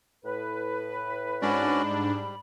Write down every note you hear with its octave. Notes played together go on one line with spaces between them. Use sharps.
A2 B4
G#2 C#4 D4 F#4 D5 B5
G3